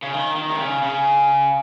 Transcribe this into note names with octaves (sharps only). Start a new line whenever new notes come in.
C#3
D#3
D#3
C3
C#3
C#3